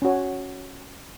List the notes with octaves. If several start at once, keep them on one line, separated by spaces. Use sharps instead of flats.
C#4 F#4 C#5